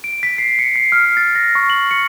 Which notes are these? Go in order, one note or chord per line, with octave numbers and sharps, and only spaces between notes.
D7
B6
C7
C#7
C7
F6
A6
A#6
C#6
F#7
C#7